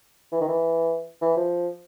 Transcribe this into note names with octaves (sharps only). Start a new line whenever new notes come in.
E3
D#3
E3
E3
F3